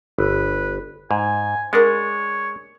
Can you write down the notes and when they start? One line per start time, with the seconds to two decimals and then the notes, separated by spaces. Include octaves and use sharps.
0.18 G1 B4
1.11 G#2 G#5
1.73 G#3 D4 A#4 C#5 F#5